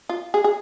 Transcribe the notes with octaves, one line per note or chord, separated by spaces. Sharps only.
F4
G#4
G#4